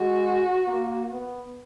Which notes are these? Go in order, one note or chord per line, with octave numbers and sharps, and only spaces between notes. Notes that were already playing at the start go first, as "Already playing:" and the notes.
Already playing: G#3 F#4
A#3
B3